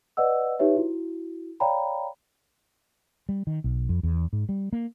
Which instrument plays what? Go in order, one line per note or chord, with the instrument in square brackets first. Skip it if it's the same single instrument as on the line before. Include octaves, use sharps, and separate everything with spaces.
[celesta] B4 D5 D#5 F#5 E6
D#4 G4 B4 C#5 E5
E4 F#4
C#5 D5 F5 G5 A#5 B5
[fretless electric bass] G3
D#3
B1
F2
E2
G#2
G3
A#3